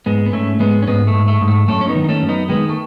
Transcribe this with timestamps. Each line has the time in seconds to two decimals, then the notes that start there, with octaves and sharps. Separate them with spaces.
0.06 G#2 G#3 B3
0.26 B3
0.33 G#2 A3 C#4
0.60 G#2 G#3 B3
0.82 C#4
0.87 G#2 G#3 B3
1.07 A3
1.14 G#2
1.28 A3
1.41 G#2
1.48 A3
1.68 F#2 A3 C#4
1.81 C#4
1.88 B3 D#4
1.95 D#3
2.04 D#4
2.09 A3 C#4
2.22 F#2
2.29 B3 D#4
2.49 D#3 G#3 B3
2.69 A3